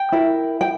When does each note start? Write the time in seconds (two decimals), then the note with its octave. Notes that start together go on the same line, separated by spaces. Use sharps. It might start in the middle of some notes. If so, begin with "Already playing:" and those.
Already playing: G5
0.12 E4 A#4
0.61 G5